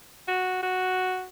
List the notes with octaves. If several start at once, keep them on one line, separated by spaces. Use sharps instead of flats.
F#4
F#4